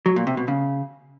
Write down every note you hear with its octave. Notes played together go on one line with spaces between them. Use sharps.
F#3
A#2
C3
B2
C#3